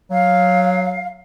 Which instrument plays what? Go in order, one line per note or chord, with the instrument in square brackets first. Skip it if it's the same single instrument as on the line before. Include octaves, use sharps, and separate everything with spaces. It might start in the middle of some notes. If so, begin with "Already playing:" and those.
[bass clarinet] F#3 [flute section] F5